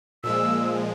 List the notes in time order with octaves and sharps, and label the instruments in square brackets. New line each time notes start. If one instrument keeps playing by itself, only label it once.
[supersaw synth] A#2 F3 G#3 [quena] E6